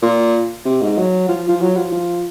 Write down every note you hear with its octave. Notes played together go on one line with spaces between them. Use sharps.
A#2
C3
G#2
F#3
F3
F3
F#3
F3
F3